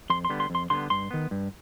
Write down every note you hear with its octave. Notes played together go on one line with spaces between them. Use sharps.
F2 C6
C6
D3 G3 B3
C6
F2
C6
D3 G3 B3 C6
G2 C6
D#3 B3
G2